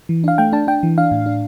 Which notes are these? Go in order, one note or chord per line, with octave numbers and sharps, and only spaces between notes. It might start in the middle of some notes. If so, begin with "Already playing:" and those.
E3
D4 F5
A3 G5
D4 A5
D4 G5
E3
D4 F5
A2
D4